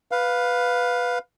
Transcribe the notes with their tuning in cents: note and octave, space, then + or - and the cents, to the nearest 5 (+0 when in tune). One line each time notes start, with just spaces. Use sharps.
B4 +0 F5 +15